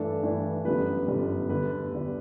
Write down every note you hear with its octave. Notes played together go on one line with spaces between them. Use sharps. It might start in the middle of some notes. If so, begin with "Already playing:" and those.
Already playing: G2 E3 A3 D4 A4
G2 E3 A3 D4
G1 F#2 D3 G3 B3 B4
G1 F#2 D3 G3 B3
E2 D3 G3 B4
E2 D3 G3